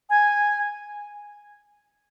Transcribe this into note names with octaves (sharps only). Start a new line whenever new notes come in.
G#5